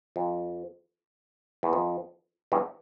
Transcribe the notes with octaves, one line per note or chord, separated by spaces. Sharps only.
F2
E2
F2
E2 G2